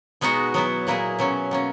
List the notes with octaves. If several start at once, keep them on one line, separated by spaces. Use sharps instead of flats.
B2 G#3 B3 D#4 F#4
F#3 B3 E4
A#2 F#3 A#3 E4 G#4
B2 F#3 C#4
B2 A#3 C#4